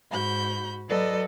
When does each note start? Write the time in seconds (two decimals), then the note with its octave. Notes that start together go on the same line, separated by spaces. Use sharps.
0.11 G#2 F#4 B5 G6
0.88 F#3 A4 B4 D5 D#5